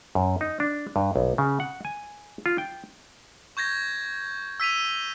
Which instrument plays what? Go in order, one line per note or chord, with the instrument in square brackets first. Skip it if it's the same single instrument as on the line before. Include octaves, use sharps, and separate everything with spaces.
[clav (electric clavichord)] F#2
D#4
D4
G2
B1
C#3
F#5
G#5
F4
G5
[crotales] C#6 G6 G#6 A#6
E6 B6 D#7 F7